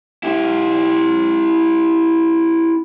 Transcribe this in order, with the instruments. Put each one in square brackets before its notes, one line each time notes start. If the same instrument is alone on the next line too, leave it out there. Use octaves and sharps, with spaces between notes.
[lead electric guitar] E4 G4